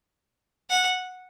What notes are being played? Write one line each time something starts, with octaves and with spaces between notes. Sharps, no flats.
F#5